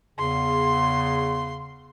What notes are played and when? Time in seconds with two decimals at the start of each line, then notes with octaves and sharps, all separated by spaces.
0.18 E2 C#3 C6